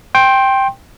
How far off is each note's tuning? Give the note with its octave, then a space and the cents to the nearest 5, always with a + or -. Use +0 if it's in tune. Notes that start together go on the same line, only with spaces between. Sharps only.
G5 +0 C6 +25